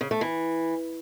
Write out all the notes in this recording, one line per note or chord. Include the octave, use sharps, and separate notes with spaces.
C#3
A3
E3